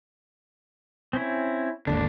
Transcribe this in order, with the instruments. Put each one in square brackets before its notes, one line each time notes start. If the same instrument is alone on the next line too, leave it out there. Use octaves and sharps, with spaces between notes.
[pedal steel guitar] C4 C#4 E4
[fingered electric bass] G#1 D#2 D3 [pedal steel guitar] D4